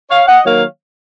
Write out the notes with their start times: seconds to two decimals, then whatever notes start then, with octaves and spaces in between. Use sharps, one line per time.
0.10 C#5 F5
0.27 D#5 F#5
0.44 D#3 F#3 A#3 C#5 F5